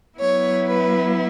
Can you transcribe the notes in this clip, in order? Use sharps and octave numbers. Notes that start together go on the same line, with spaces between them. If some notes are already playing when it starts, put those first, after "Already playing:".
F#3 B3 E4 C#5
B4